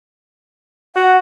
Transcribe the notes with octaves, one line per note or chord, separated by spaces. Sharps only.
F#4 F#5